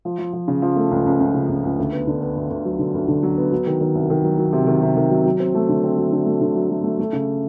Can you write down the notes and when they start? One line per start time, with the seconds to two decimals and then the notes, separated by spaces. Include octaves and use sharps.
0.05 F3
0.18 F3
0.33 F3
0.48 C#3
0.62 F3
0.76 A3
0.91 C#2
1.06 C#2
1.20 C#2
1.35 C#3
1.49 C#2
1.63 C#2
1.78 D2
1.92 B3
2.07 D3
2.22 B3
2.36 D2
2.50 D2
2.65 F#3
2.79 D3
2.94 D2
3.08 D3
3.23 F#3
3.37 B3
3.52 F#3
3.67 D#3
3.81 D#3
3.95 C2
4.10 D#3
4.24 F#3
4.38 F#3
4.53 C3
4.67 D#3
4.82 C3
4.97 D#3
5.10 F#3
5.26 F#3
5.40 C4
5.54 A3
5.69 D3
5.84 C4
5.98 F#3
6.12 D3
6.26 A3
6.41 D3
6.55 F#3
6.70 F#3
6.84 A3
6.99 A3
7.13 C#3